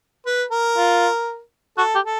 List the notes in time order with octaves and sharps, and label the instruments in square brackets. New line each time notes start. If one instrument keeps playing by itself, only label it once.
[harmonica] B4
A#4
[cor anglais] F4
[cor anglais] F#4 [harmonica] A4
[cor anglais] G4
[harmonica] A4